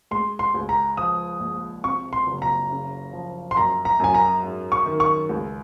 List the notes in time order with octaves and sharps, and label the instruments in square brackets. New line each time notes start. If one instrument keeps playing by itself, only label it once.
[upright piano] G#3 [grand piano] C6
[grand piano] C6
[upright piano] C#2
[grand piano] A#5
[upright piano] F3 [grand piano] D#6
[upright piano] A#1
[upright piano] C3 [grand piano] C#6
[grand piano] C6
[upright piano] F#1
[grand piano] A#5
[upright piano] C#3
F3
[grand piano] C6
[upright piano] F#2 [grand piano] A#5
[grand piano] A#5
[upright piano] F#2 [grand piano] G#5
[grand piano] A#5
[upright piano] G#2
[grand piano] C#6
[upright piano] D#3
[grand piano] C#6
[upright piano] C#2